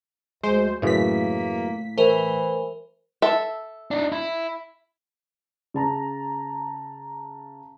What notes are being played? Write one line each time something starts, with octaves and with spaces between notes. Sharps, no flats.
D2 G#3 C5
F#2 A2 C#3 E3 A#3 B6
E3 A3 A#4 C5
A4 E5
D4 D#4
E4
C#3 A5 A#5